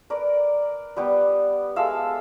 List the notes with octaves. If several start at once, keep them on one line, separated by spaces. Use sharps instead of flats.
A#4 B4 D5
G3 B3 G4
G#3 A4 E5 F5